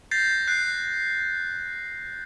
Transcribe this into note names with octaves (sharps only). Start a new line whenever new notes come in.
G6 A6 A#6 C7
F#6 C7